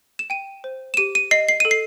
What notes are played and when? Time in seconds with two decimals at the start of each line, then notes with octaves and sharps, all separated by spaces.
0.19 E7
0.30 G5 D#7
0.64 C5
0.94 E7
0.97 G4 D#7
1.15 D#7
1.31 D#5 C7
1.48 C7
1.60 A4 D#7
1.71 C7